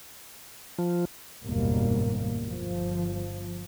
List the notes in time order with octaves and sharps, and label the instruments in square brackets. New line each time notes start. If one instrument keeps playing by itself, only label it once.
[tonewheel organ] F3
[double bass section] F#1 D#2 G#2 B2 G3 A#3
G1 F3